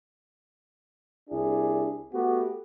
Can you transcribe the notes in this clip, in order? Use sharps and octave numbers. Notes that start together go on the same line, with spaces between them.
C2 D4 E4 G#4
A3 B3 F#4 G4